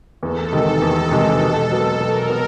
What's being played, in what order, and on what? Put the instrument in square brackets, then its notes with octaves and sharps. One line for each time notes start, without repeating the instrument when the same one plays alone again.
[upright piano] E2 [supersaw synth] A4
[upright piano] C3 D#3 G#3
E2
C3 D#3 G#3
B2
F#3 B3
[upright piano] B2 [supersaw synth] A#4
[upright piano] B3